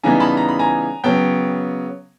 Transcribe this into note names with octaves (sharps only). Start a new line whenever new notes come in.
C#3 E3 G3 B3 D#4 G#5 A#5
A5 B5
A#5
B5
G#5 A#5
C#3 F#3 B3 G5 A5